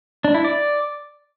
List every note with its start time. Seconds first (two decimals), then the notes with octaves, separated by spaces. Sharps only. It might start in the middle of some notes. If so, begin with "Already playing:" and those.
0.24 D4
0.34 E4
0.44 D5